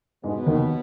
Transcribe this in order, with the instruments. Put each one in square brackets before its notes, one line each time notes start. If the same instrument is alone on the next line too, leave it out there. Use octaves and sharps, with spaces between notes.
[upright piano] G#2 G#3 [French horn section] B2 F#3 B3
[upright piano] D#2 D#3